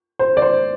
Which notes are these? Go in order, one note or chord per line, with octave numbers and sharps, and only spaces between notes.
C5
D5
C5